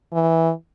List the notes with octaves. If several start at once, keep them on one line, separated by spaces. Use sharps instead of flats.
E3